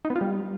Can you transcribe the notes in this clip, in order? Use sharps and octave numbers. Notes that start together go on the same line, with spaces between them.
D#4
B3
F4
G3